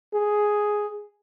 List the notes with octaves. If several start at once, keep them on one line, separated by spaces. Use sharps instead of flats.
G#4